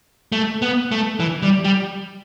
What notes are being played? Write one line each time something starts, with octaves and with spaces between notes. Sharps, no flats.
A3
B3
A3
E3
G3
G3